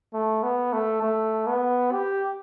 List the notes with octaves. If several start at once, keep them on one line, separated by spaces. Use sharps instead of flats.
A3
B3
A3
A3
B3
G4